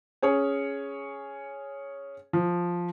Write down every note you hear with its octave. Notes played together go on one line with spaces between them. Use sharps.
C#4 G#4 C#5
F3